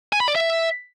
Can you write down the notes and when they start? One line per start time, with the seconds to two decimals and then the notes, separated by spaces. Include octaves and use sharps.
0.13 G#5
0.20 B5
0.28 D5
0.35 E5